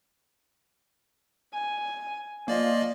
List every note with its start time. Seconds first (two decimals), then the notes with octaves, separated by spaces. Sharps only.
1.53 G#5
2.48 F3 A#3 D5 D#5